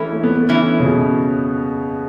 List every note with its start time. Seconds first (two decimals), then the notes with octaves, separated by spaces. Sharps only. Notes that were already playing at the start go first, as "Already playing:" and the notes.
Already playing: E3 A3 C#4 E4
0.12 A3
0.23 B3
0.35 A3
0.49 E3 C#4 E4
0.80 C#3
0.85 B2